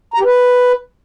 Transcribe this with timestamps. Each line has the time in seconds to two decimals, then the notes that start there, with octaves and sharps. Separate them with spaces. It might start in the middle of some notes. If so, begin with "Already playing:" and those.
0.14 A#5
0.19 G4
0.25 B4